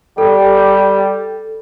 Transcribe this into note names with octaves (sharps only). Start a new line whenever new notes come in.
G3 G4 A4